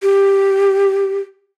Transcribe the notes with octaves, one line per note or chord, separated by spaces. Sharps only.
G4